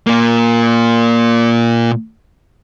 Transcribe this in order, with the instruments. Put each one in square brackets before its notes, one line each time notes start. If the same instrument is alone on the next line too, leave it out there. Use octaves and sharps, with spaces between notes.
[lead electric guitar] A#2 A#3